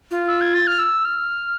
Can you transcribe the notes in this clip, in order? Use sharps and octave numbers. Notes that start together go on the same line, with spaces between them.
F4
E6
G#6
A6
F6
E6
F6